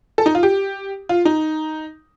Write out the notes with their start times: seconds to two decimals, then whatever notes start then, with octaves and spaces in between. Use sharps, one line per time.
0.18 A4
0.26 D#4
0.35 F4
0.43 G4
1.09 F4
1.25 D#4